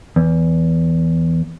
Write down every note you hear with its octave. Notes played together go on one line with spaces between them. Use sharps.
E2